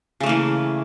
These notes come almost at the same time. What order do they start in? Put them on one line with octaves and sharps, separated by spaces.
C#3 A3 A#3 E3